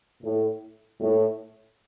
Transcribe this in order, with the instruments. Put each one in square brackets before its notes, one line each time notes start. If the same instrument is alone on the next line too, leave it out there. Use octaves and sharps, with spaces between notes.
[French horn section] A2
A2